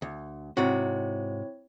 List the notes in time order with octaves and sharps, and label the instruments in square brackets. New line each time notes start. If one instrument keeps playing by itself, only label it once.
[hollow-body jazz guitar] D2
[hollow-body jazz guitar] G#2 C3 F#4 [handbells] C4 E4 C#5